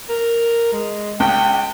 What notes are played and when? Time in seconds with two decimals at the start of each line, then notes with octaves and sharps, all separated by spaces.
0.09 A#4
0.73 G#3
1.20 C#2 G5